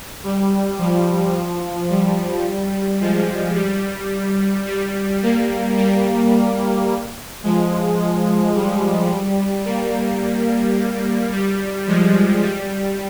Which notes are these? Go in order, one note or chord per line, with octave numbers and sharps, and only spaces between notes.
G3
F3
G3
F3 G#3
G3
G3
G3 A#3
G3 A#3
F3 G#3
G3
G3 A#3
G3
F3 G#3
G3